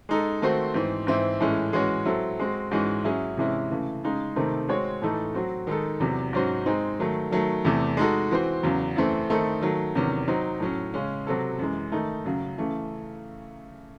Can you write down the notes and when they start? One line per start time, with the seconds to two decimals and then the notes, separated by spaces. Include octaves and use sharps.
0.09 G#3 D#4 A4
0.42 D#3 A3 C4 F#4 C5
0.74 G#2 E3 C4
1.07 G#2 E3 C4 E4 C5
1.40 A2 E3 G#3 C#4 E4
1.73 E3 G#3 C#4 F#4 C#5
2.05 F#3 C4 E4 A4
2.39 G#3 C4 F#4
2.71 G#2 E3 G#3 C#4 F#4
3.04 F#3 C#4 E4 G#4
3.37 C3 E3 G#3 C#4 E4
3.71 C#3 E3 A3
4.04 C#3 G#3 D#4
4.36 C3 D#3 A3 C4 D#4
4.68 G#3 C4 F#4 C#5
5.02 A2 E3 A3 D#4 A4
5.34 F#3 C4 F#4
5.67 D#3 G#3 D#4 A4
6.00 E2 C3 F#3
6.33 G#2 F#3 C#4 F#4 C5
6.66 G#3 C4 D#4
6.99 D#3 F#3 A3
7.31 D#3 F#3 A3
7.65 E2 C3 E3 A3
7.97 G#3 D#4 F#4 A4
8.31 E3 C4 F#4 C5
8.63 E2 C#3 F#3
8.96 F#2 E3 A3 C4
9.30 D#3 A3 C4 D#4 A4
9.61 D#3 F#3 A3
9.95 E2 C3 D#3 F#3 C#4
10.28 F#3 C4 D#4
10.60 A2 F#3 C#4
10.94 C#3 G#3 C#4
11.27 C3 F#3 C4 F#4 A4
11.59 F#2 E3 G#3
11.92 D#3 A3 D#4
12.24 F#2 C#3 F#3
12.58 C#3 E3 A3